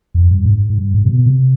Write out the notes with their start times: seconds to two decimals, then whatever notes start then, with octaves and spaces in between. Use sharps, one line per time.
0.14 F2
0.31 G2
0.46 G#2
0.70 G#2
0.78 G2
0.94 G#2
1.05 C3
1.10 B2
1.26 C3